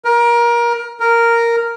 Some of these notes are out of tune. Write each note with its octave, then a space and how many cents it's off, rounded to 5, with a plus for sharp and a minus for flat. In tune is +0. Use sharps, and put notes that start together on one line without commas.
A#4 +25
A#4 -5